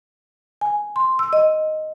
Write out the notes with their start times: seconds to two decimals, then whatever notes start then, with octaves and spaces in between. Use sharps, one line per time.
0.61 G#5
0.96 C6
1.19 E6
1.33 D#5